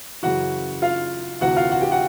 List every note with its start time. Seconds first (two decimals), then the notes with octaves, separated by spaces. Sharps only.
0.23 F#2 C#3 E3 F#4 F#5
0.82 F4 F5
1.41 D2 C3 E3 F#4 F#5
1.57 F4 F5
1.72 F#4 F#5
1.81 G4 G5
1.91 F#4 F#5